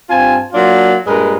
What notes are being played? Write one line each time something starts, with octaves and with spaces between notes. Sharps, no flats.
G2 C4 F4 G#5 A5
F#3 A#3 D4 F4
G2 A#2 G#3 A#4 B4